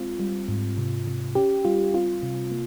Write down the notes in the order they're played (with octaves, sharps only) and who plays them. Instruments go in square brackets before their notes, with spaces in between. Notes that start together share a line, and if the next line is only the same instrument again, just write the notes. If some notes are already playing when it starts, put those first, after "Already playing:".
Already playing: [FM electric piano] G#3 C4 F4
G3
G#2
C3
C3
C#4 G4
G3 F4
C4 F4
C3
A#3